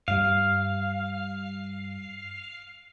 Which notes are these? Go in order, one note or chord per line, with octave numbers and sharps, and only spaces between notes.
G2 G3 F5